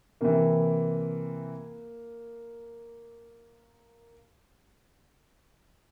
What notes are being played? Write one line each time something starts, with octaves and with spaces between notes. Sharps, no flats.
C3 E3 A#3